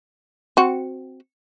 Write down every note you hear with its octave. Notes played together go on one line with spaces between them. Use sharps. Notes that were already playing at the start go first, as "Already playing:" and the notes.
C4 F#4